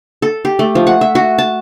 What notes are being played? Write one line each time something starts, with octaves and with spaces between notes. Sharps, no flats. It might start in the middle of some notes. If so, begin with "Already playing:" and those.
A4
G4
A3
F3
F#5
E5
F#4
A5